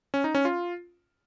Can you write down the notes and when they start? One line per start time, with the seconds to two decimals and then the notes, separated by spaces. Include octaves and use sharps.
0.14 C#4
0.24 D#4
0.35 C#4
0.45 F4